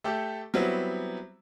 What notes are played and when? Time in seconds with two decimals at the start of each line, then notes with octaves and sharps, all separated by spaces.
0.04 A3 G4 A4
0.54 F#3 G3 B3 C4 E4